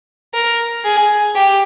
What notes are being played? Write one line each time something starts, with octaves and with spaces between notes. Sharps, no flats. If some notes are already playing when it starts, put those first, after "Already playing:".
A#4
G#4
G4